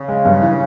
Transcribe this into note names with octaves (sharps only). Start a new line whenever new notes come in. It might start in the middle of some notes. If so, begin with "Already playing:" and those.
Already playing: C#3
G#3
G2
E3